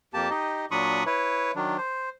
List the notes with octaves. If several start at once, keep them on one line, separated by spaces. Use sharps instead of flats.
F2 A#3 G4 A5
D#4 G4 D#5
A#2 F#3 D4 B5 C#6 D#6
E4 B4 C#5
D#3 F#3 D4
C5